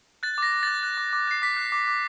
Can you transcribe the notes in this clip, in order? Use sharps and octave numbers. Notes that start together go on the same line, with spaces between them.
F#6 A6
D6 A#6
D6
F#6 A6
F#6
D6
D6
F#6 C7
D6 B6
F#6
D6
D6